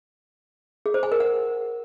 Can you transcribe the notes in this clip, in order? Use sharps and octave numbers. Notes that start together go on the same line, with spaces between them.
G#4
C5
G#5
A#4
F#5